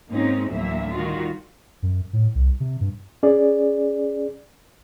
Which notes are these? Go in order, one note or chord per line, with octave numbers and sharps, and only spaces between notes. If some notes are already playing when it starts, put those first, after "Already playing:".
G#2 A#3 C4 C#4 D#4
D2 A2 E3 F#3 A#3 E5
D#3 G3 F4 F#4
F#2
A2
C2
C3
G2
C#4 G#4 D5